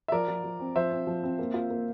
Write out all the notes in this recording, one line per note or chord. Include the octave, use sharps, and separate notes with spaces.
E5
F3 A#4 D5
F3
F3
C4
F3 C5 E5
C4
F3
C4
A#3
F4
A#3